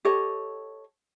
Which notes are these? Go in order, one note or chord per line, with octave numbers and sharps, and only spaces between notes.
G4 A4 C#5 D#5